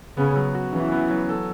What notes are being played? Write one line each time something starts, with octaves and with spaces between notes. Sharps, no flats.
C#3 B3
F#3
F#4
C#3 E3
B3
F#3
A4